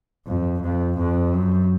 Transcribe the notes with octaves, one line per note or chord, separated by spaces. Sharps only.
F2
F2
F2
F#2